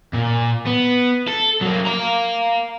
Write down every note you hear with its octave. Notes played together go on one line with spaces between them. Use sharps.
A#2
B3
A4
F#3 A#3
F5 A#5